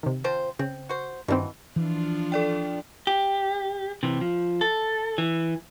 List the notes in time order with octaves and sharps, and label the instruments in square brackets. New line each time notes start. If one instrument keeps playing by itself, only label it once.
[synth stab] C3 D#3
[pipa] F3 C4 C5
[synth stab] C#3 [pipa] C4
[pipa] F#4 C5
[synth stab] G2 D#3 C4 [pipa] B2 E3
[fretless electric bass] E3 [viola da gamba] F3 D4 F4
[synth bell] A4 D5 G5
[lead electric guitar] G4
C3 E3
F3
A4
E3